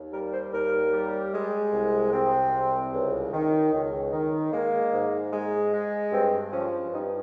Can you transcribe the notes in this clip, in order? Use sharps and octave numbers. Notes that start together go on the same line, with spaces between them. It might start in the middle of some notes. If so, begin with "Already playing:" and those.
Already playing: D#2
G3 A#4
C5
D#2 A#4
G3
G#3
C2
C3 C4
C2
C#2
D#3
C#2
D#3
G#3 A#3
G#2
G#3
G#3
G2 C4
F3 C#4
G2 D#4